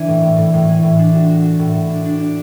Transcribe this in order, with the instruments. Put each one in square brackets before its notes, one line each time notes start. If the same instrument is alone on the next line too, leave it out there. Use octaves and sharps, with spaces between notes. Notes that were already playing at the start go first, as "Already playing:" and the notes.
Already playing: [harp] E3 D4
A2
A2
A2
A2
E3
A2
D4
F#4
F#4
F#4
A2
A2
D4
D4
D4